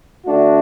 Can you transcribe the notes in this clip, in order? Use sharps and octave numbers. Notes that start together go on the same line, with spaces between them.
D3 A3 D4 F#4